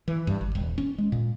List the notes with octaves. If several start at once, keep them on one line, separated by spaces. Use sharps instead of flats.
E3
G2
G1
D#1
C#4
G#3
A#2